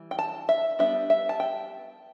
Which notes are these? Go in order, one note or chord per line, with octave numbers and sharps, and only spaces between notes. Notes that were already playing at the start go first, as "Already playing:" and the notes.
Already playing: E3 G3
G5
A5
E5
G3 B3 D4 E5
E5
A5
G5